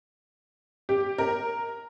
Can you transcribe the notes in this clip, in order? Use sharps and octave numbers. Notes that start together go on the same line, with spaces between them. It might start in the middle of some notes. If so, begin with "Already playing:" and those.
G4
A#4